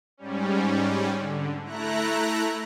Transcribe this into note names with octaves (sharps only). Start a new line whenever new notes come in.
G#2 G3 C#4
D3
A3 E4 A#5 F#6